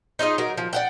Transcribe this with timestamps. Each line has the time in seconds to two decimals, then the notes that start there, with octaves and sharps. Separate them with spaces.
0.19 D#4 F4 G#4 D#5
0.38 F#3 A#4
0.57 F3
0.73 D5 F#5 G5